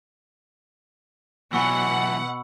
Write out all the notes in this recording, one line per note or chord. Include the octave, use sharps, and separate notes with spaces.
B2 E3 F#3 F#5 B5 C#6 E6